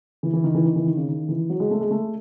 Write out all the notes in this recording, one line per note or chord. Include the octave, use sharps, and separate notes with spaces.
E3
E3
D#3
E3
D#3
E3
D#3
C#3
D#3
E3
F#3
G#3
A3
G#3
A3